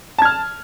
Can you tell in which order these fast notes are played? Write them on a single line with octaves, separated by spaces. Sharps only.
A5 G#6 F6